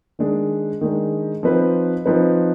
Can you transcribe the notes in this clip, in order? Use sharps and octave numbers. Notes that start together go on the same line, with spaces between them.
D#3 G#3 D4
D#3 G#3 D4
F3 C4 D#4 B4
F3 C4 D#4 B4